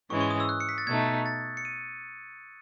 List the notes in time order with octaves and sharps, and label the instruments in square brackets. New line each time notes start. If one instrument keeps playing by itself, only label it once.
[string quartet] G#2 E3 G#3 C#4 [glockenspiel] C#6
[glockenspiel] C#6
D#6
E6
F#6
C#7
B6
A6
[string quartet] B2 A3 D#4 [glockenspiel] G#6
[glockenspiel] A6
C#7
D#7